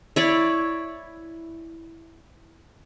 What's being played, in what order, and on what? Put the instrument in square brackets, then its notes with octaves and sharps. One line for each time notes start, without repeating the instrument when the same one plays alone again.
[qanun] E4 C#5 D5